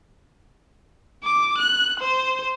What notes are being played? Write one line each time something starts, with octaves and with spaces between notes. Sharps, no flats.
D6
F#6
C5